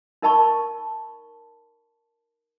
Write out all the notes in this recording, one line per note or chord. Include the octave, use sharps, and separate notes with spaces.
D#4 A#4 D#5 A5 B5 C#6